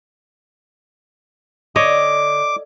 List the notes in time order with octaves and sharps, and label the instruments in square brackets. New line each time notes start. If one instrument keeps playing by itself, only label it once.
[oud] D3 [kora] C#5 D#5 [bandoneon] D6